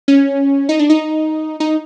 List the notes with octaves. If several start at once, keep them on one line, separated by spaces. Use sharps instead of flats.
C#4
D#4
D4
D#4
D#4